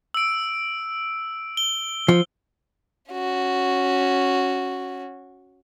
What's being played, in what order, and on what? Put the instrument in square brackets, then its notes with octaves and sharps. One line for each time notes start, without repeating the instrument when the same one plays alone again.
[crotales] E6 D7
G7
[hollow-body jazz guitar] F3
[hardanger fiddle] C#4 F#4